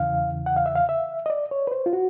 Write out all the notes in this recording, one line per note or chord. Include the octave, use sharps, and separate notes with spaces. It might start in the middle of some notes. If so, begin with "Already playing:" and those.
Already playing: E2 C#3 E3 F5
F#5
F5
E5
F5
E5
D#5
D5
C#5
B4
C5
F4
F#4